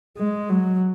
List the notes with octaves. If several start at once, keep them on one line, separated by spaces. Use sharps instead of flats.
G#3
F#3